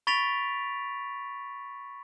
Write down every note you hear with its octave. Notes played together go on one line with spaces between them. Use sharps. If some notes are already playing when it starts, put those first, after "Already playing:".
B5 C#6 A6 B6 D7 F7